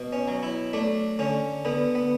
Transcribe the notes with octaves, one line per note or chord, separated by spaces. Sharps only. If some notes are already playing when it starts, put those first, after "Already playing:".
Already playing: B2
C#4
F#3
E4
A3 D4
D3 C#4
D3 B3
B3